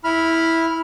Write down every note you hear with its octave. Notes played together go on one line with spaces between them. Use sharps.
E4 B5 F6